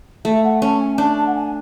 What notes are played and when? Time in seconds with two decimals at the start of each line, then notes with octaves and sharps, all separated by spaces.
0.25 A3 E5
0.44 F#5
0.62 C#4 A5
0.80 G#5
0.98 D4 A5
1.16 A5
1.26 F#5
1.35 G#5